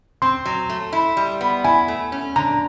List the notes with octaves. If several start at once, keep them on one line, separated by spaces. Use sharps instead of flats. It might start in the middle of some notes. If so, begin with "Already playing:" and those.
C4 C6
F#3
A3
E4
G3
B3
E4 G#5
A3
C#4
D3 A#5